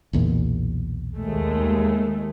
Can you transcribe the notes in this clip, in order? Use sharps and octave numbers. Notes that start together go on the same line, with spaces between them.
B1 E2 A#2
D#2 G#3 A3